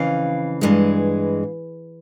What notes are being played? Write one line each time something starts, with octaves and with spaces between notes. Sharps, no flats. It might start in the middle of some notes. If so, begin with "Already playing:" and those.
Already playing: F2 C#3 E3 F5
G2 E3 G#3